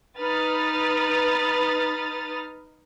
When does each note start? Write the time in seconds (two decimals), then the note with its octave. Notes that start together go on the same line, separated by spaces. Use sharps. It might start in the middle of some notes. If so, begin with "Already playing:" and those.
0.20 D#4 B4 D#6 F6 A6